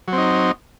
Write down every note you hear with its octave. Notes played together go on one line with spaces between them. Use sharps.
F#3 C4 D#4